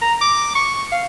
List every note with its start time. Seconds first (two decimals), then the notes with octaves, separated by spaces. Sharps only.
0.02 A#5
0.21 D6
0.55 C#6
0.92 F5